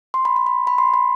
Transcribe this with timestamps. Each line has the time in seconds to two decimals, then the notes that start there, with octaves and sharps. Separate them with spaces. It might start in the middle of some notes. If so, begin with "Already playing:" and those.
0.14 C6
0.25 B5
0.36 C6
0.46 B5
0.67 B5
0.78 C6
0.94 B5